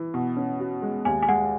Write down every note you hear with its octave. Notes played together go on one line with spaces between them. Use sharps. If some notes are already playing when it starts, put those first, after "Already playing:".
Already playing: E3
B2
C#4
F#4
G#3
D#2 G#5
G#5
G#3 F#5